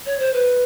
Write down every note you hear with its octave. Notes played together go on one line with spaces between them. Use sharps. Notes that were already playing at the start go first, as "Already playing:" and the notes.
C#5
C5
B4